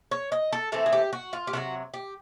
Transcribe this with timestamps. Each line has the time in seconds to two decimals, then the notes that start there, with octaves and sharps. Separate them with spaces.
0.11 C#5
0.32 D#5
0.53 A4
0.72 E3 A3 C4 A4
0.86 G#4
0.93 G4
1.13 F#4
1.33 F4
1.47 G4
1.53 C3 D#3 F#3 F#4
1.94 G4